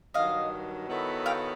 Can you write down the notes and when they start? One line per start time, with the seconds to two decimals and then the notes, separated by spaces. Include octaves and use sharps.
0.14 G2 D#3 F#3 D#5 F5
0.89 D#3 F#3 B3 E4 A4
1.26 F5 G5